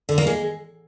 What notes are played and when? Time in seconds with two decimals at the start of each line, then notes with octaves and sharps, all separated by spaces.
0.09 D3
0.18 A#3
0.27 G#3